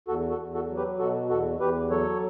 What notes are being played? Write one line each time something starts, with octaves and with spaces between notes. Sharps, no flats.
E2 F#4 A4
F#4 A4
E2
F#4 A4
F#3
G4 B4
B2 F#4 A4
E2 F#4 A4
E2 G4 B4
F#3 A4 C#5